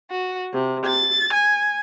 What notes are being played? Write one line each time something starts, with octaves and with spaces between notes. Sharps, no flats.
F#4
C3
A6
G#5